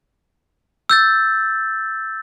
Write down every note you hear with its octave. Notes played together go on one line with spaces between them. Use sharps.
E6 G6 A6